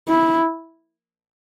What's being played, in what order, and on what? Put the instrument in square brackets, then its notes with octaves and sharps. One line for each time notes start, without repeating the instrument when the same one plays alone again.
[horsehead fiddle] E4